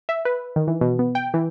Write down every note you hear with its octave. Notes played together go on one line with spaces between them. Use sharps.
E5
B4
D#3
E3
B2
B3
G5
E3